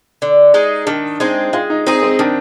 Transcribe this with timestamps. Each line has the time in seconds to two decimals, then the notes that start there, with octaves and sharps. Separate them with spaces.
0.22 D3
0.54 G#3 D#4 G#4
0.87 D#3 D4
1.20 G#3 C4 D#4
1.53 G#3 F4
1.70 D#4
1.87 C4 D#4 G#4
2.03 C4
2.19 D#3 D4